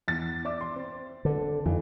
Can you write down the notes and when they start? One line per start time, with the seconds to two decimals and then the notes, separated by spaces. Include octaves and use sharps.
0.08 E2 A6
0.45 D5 E5 D6
0.61 C6
0.76 C4
1.25 D3
1.66 F2 E3